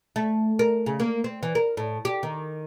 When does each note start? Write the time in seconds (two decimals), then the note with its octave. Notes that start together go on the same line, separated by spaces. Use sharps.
0.16 A3
0.59 A#4
0.86 C#3
1.00 A#3
1.24 C4
1.43 E3
1.55 A#4
1.77 A2
2.05 G4
2.23 D#3